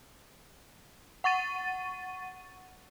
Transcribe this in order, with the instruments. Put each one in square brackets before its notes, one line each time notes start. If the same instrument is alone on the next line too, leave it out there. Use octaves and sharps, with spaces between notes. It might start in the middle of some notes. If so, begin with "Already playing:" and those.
[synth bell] F#5 C#6 A6 D#7